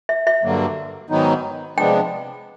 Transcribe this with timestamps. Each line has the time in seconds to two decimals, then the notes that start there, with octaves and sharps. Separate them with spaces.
0.09 E5
0.27 E5
0.43 G2 D3 F#3 A#3
1.10 G#2 D#3 F#3 B3 D#4
1.77 C3 F3 G#3 B3 D4 G5